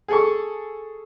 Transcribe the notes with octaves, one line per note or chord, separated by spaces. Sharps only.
G#4 A4 C#6